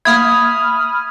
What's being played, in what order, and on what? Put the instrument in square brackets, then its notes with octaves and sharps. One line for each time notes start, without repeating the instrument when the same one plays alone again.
[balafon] A#3 E5 [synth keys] B5 D#6 F6 [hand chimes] G#6